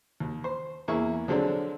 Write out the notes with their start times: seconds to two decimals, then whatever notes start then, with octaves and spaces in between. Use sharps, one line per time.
0.20 D#2
0.44 C5
0.88 E2 A#3 E4 G#4 C#6
1.28 D3 F3 F#3 G#3 C4 D4